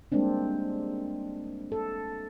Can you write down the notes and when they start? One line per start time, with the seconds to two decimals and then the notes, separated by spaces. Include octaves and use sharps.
0.12 G3 G#3 A#3 C4 D4
1.72 A4